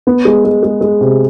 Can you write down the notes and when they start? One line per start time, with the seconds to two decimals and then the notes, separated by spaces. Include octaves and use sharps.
0.07 B3
0.25 G#3
0.45 G#3
0.63 G#3
0.81 G#3
1.01 C3